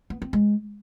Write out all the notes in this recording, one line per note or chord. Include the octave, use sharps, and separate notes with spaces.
B3
C4
G#3